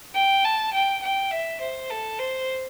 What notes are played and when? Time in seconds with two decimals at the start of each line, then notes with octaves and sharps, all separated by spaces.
0.15 G5
0.45 A5
0.73 G5
1.02 G5
1.32 E5
1.61 C5
1.91 A4
2.19 C5